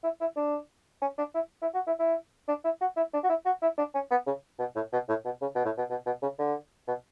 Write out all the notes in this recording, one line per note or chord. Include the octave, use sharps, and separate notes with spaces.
E4
E4
D4
C#4
D4
E4
E4
F#4
E4
E4
D4
E4
F#4
E4
D4
F#4
E4
F#4
E4
D4
C#4
B3
C#3
B2
A2
B2
A2
B2
C#3
B2
A2
B2
B2
B2
C#3
D3
B2